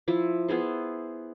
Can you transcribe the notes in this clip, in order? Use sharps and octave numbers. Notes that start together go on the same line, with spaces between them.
F3 E4
B3 E4 G#4 C5